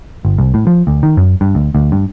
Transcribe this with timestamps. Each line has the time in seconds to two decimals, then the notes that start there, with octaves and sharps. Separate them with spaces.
0.25 G1
0.38 C2
0.54 A2
0.67 F3
0.87 D2
1.03 D#3
1.17 F#2
1.41 G2
1.55 D2
1.75 D2
1.92 G2